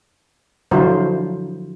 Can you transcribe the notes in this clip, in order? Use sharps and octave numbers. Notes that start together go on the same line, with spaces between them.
D3 F3 F#3 E4 F4 C5